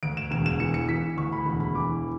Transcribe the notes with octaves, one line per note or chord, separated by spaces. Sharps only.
D2 D7
E7
E1 E7
E7
E3 C#7
C#7
E3 B6
D2 C#6
B5
E1 B5
B5
E3 D6